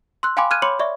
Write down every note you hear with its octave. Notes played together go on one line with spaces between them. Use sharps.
C6 E6 F#6
F5 G5 G#5 B5 C6 D6
F6 F#6 G#6 D#7
C#5 B5 C6 D6 C#7 F#7
D5 E5 C#6